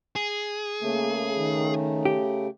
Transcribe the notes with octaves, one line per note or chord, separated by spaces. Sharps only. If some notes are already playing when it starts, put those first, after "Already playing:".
G#4
C#3 A3 A#3
D#3
G4